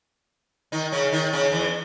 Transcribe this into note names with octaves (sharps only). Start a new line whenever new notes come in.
D#3 D#4
C#3 C#4
D#3 D#4
C#3 C#4
E2 E3